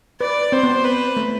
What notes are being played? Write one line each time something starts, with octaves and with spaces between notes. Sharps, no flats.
B4 D5
C4 C5
B3
B4
A3